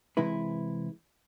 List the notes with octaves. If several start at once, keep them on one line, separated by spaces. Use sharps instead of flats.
C3 E3 G#3 E4 B4